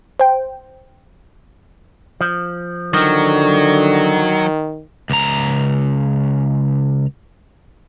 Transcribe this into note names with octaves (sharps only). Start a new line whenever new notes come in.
C5 G5
F3
D3 D#3 F3 F#3
C#2 A#5